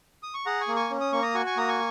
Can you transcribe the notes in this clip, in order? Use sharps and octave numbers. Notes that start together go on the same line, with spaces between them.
D#6
C#6
G#4 F#5 A#5
G#5 C#6
A#3
G#5 C#6
C#4
D#6
A#3 C#6
A#5 D#6
F#4 G#5 C#6
G#5 C#6
A#3 A#5 D#6
G#5 C#6